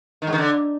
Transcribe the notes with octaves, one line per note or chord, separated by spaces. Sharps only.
D#3
G#2
D#3
D3